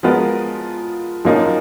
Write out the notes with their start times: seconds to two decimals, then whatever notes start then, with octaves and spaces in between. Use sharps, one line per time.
0.03 F3 G#3 B3 F4 A#4
1.25 F#2 F3 A#3 D#4